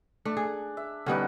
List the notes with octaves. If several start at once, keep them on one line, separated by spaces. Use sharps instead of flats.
A3 D4
G#4
E5
D3 G3 B3 C#4 D#4 F#4